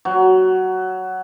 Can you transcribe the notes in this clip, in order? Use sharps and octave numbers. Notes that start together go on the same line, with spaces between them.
F#3